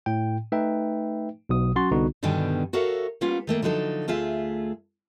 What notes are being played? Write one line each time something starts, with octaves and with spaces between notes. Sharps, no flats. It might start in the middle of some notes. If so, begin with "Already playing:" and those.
A2 G5
A3 D#4 B4 E5 G5
B1 B2 D#6
F#3 C#4 F#4 C6 A6
C2 D3 B3 D#4 F#4
G2 B2 D3 D#3 G3 G#5
F#4 A4 A#4 C#5 E5 F5
G3 A#3 B3 C#4 F4
D#3 A3 A#3
D3 F3 F#3 D#4 A4
D2 A3 F4 G#4 E5